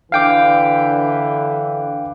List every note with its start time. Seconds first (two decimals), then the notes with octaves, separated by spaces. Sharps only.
0.12 D3 E3 F5 G5 D6